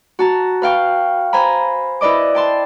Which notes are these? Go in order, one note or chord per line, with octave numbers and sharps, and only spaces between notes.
F#4 A5 A#5
B4 F5 G5 C#6
C5 G#5 A#5 B5
E4 B4 D5 D#5 D6
G5 A5 C6